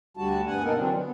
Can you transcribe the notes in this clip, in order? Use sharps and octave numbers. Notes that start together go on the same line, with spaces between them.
D2 D3 G3 F#4 A5
G2 B3 F#5 G#5
B2 A#3 D#4 A4 A#4
D3 E3 F#3 C4 D4
B3